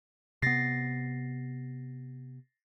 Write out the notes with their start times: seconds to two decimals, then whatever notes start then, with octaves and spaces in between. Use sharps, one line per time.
0.42 C3 B3 A6 A#6 C7